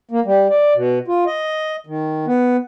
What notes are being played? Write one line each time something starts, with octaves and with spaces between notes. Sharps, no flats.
A#3
G3
D5
B2
F4
D#5
D#3
B3